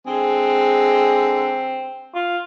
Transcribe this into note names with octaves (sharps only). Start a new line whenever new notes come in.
D3 G#3 C4 G#4
F4